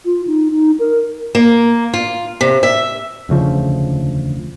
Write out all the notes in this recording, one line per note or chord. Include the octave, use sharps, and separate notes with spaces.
F4
D#4
D#4
A#4
A#3
F4
C3
E5
E1 D2 C#3 F3